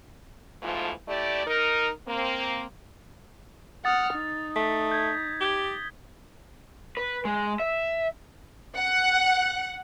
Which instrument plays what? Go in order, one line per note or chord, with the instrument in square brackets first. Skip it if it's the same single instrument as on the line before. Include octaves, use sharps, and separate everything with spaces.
[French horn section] G#2 B2 E3 F3 A3 F4
A3 E4 G4 D5
D#4 A#4
A#3 C4
[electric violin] F#5 F6 [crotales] D#6 A6
[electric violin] D#4
[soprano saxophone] A3 [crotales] B6
[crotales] G6 G#6
[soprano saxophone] G4 [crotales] G#6 G7
[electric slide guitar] B4
G#3
E5
[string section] F#5